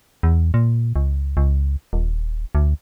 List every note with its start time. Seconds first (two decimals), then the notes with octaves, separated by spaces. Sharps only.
0.23 E2
0.54 A#2
0.96 C#2
1.37 C#2
1.93 D#1
2.55 D2